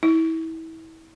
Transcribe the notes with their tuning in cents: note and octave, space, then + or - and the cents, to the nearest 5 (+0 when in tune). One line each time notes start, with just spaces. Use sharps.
E4 -30